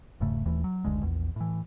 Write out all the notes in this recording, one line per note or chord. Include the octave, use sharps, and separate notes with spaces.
E1 G#2 C#3 A3
D#1 D#2 E3 A3
F#3
F#1 D2 G#3
A#1 E2
A2 E3